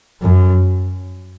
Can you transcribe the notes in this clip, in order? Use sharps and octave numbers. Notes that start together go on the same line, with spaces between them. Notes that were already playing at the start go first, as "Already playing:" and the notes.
F#2